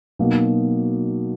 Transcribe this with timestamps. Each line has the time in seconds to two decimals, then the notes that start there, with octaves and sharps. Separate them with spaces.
0.19 B2 F#3 A#3 D#4 F#4